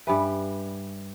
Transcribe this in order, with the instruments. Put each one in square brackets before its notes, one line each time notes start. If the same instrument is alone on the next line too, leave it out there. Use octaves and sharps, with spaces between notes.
[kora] G2 G3 B4 [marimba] E5 G#5 B5